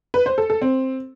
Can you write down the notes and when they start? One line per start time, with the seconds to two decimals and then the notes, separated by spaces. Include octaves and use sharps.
0.14 B4
0.26 C5
0.38 A4
0.50 A4
0.62 C4